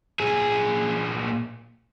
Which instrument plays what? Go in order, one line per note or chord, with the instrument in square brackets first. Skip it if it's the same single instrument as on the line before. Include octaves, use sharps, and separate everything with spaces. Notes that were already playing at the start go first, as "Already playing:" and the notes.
[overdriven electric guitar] A#2 G#4